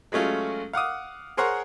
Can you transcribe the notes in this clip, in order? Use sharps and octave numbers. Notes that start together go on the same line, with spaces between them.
F#3 G#3 A3 C#4 F4
F5 F#5 D6 D#6
G#4 A#4 C5 C#5 F#5